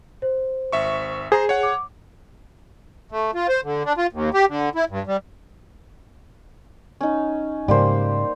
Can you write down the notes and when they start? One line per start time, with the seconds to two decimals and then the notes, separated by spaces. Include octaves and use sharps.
0.22 C5
0.72 G#1 E5 C#6
1.32 G#4 C5 A#5
1.49 C#5 F#5
1.63 D6
3.12 A3
3.35 F4
3.48 C5
3.64 D3
3.86 D4
3.98 F4
4.13 D#2
4.34 G4
4.48 D3
4.75 E4
4.89 G2
5.07 G3
7.01 C#4 D#4
7.68 G#2 C#3 G3 A#3 C5